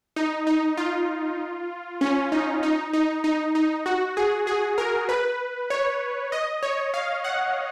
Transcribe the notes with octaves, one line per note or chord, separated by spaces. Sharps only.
D#4
D#4
F4
C#4
D#4
D#4
D#4
D#4
D#4
F#4
G#4
G#4
A#4
B4
C#5
D#5
C#5
F5
F#5